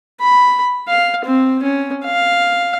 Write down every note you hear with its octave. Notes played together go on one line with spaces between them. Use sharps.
B5
F5
C4
C#4
F5